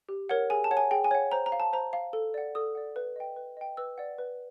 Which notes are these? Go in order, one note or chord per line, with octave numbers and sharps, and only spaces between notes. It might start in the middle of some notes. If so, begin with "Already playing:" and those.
G4
A#4 C#5 F#5
G#4 G#5
A5
C#5 F#5
G#5
G#4 G5
G#5
C#5 F#5
C5 A#5
A#5
F5
A5
C5 A#5
F5
A4
D5 F#5
A4 D#6
D5 F#5
B4
D#5 G5
B4
D#5 G5
B4 E6
D5 F#5
B4